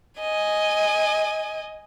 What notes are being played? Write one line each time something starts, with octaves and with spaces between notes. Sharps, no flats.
D#5 G#5